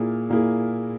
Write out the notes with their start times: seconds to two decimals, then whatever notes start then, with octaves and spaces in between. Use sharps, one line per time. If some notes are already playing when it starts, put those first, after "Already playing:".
Already playing: A#2 A#3 E4 G#4
0.30 A#2 A#3 E4 G#4